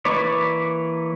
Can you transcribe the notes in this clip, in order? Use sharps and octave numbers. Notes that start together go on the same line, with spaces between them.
E3 A#3 B4 C#5 D5